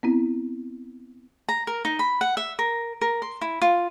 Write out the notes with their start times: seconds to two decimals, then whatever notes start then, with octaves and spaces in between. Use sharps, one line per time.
0.03 B3 C4 E4
1.49 A#5
1.67 A#4
1.85 D#4
1.99 B5
2.21 F#5
2.37 E5
2.59 A#4
3.01 A#4
3.22 C6
3.41 E4
3.62 F4